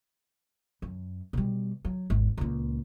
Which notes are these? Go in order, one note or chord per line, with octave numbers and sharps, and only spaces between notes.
F#2
B2 G3
F#3
G#1 E2
C#2 A#2